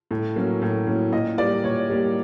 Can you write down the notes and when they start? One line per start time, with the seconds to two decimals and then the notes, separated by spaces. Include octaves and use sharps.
0.11 A2
0.36 F#3 A#3 C#4
0.62 A2
0.87 F#3 A#3 C#4
1.12 A#2 D#5
1.38 G3 A#3 D5
1.64 A#2 C#5
1.90 G3 A#3